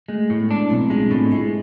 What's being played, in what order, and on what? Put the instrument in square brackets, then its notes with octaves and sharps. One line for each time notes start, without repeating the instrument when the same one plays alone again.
[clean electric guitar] G#3 [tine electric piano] A3
[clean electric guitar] A2
[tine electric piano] G#3 B3
[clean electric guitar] D4
[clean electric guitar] B1 [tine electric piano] C4 E4
[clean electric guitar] G#3 [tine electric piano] D4 F4
[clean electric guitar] A2 [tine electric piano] C4 E4
[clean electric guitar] G#3 [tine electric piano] E4 G#4